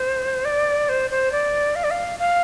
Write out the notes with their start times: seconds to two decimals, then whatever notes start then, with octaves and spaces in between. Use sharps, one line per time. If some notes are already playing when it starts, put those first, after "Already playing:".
Already playing: C5
0.45 D5
0.89 C5
1.10 C5
1.32 D5
1.76 F5
1.84 D5
1.91 F5
2.19 F5